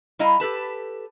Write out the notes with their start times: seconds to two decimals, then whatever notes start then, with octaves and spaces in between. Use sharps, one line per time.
0.19 G3 E4 D#5 F5 G#5 A#5
0.40 G4 A4 B4 A5